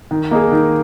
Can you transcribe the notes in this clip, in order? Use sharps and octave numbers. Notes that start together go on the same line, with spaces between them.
D#3
A#3 D#4 G#4
D#3